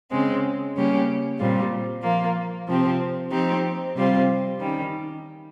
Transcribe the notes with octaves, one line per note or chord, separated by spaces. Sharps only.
C#3 G#3 C4
C#3 G3 A#3 C#4 G4
A#2 G3 C4 F4
F3 A#3 F4
C3 F3 C4 G4
F3 C4 D#4 G4
C3 G3 C4 F4
D#3 G3 C#4